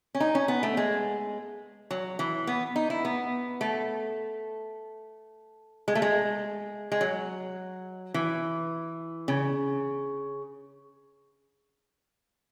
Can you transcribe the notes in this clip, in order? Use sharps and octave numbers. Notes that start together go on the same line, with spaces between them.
C#4
D#4
C#4
B3
A3
G#3
F#3
E3
B3
D#4
E4
B3
A3
G#3
A3
G#3
G#3
F#3
E3
C#3